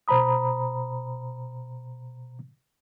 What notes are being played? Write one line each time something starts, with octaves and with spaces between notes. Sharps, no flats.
B2 C5 A#5 B5 D#6